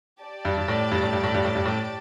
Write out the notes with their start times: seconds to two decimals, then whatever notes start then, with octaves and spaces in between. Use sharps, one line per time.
0.22 G4 D5 A5
0.45 G2
0.58 G2
0.68 A2
0.91 G2
1.02 A2
1.13 G2
1.24 A2
1.34 G2
1.45 A2
1.55 G2
1.66 A2